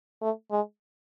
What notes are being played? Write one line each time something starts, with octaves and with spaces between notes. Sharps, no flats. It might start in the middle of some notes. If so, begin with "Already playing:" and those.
A3
G#3